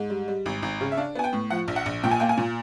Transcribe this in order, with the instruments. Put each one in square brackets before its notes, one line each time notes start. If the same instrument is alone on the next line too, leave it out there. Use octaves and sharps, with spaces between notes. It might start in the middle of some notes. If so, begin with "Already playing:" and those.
Already playing: [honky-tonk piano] G#2
G3
G3
G#1
G#1
C#3
E5
D4 F5
B3 G#5
G5
A2
F3 F#5
A#1
F#5
A#1
A#2 G5
G#5
A#3 G5
G#5
A#2